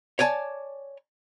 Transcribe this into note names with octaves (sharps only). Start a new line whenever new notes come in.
C#5 D5 G#5 A5